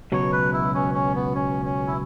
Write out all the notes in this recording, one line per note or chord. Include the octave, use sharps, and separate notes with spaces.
C#2 B2 F#3 C#5
B4
E4
C#4
C#4
B3
C#4
C#4
E4